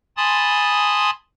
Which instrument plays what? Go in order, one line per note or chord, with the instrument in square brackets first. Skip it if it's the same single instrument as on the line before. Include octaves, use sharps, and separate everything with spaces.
[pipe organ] G#5 A5 B5 C6 D#6 A6